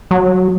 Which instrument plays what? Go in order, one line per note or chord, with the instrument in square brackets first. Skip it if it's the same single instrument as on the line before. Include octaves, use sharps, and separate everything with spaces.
[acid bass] F#3